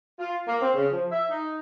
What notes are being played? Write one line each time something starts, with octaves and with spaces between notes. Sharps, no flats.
F4
A#3
C4
C#3
F3
E5
D#4